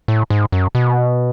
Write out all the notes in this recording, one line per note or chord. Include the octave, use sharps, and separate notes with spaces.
A2
G#2
F#2
B2